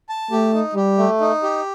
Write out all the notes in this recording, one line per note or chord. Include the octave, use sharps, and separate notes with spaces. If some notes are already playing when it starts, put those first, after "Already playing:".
A5
A3 G4
D#4
G3 G4
A3
D#4
G4